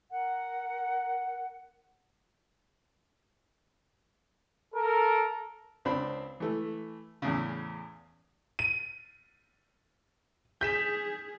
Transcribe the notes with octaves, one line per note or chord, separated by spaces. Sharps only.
A#4 F#5
A4 A#4
C#2 C4 D4 C5 B5
E3 A3
E2 A2 C#3
D#7
G#4 G6 B6 E7